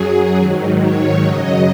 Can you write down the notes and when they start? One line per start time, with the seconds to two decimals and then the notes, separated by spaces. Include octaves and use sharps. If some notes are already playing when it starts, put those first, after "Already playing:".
Already playing: F#2 F#3 G#4
0.37 G#2 D#3 F#3
0.80 C#5
1.22 F#2 C#3 F#3 D#5